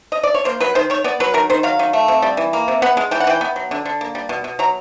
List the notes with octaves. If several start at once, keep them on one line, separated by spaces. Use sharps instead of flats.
D#5
D5
C#5
A#3 C5
F#3 B4
D#3 C5
D#3 C#5
B3 D5
F#3 B4
D#3 A#4
D#3 C5
F#3 F5
D#3
A3
C3
G3
E3
A#3
C3
B3 F#5
G#3
E3 G5
F#5
E3 G5
B3
F#3
D3
D3
A#3
G3
B2
B2
F#3 A#5